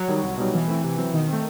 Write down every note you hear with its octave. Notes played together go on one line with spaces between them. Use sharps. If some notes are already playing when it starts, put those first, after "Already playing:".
Already playing: F#3
D#3 G3 D#4
C2
B2 G3 D#4
B2 E3
A3 C4 E4
C3
F#3 C4
B2 D#3
A3 C4